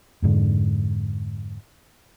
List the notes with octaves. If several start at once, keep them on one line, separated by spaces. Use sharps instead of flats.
F2 G#2 D3